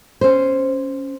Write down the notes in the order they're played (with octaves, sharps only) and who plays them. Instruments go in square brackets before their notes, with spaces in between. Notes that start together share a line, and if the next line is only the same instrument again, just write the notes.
[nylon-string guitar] C#4 C5